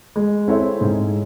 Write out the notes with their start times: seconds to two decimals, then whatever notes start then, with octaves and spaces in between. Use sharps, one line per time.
0.16 G#3
0.48 C4 E4 A4 C#5
0.81 G#2